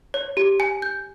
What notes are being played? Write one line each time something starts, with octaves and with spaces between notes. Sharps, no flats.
C#5
G4
G#5
G6